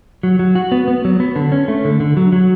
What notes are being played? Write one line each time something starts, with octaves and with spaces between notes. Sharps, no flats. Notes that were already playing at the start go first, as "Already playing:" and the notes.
F#3
F#3
F#4
B3
B3
F#3
B3
D3
C#4
A3
D3
D3
F#3
F#3